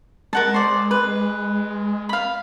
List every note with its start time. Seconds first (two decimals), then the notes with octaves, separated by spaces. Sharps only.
0.33 G#3 A#4 F#5 A5
0.54 C5 D5
0.91 B4
2.09 F5 B5